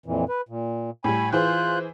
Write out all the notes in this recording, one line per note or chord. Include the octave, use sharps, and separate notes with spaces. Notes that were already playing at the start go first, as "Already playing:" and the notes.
F2 A#2 E3
B4
A#2
A2 G3 G#5 B5
E3 F4 G#4 C5 F#6 G6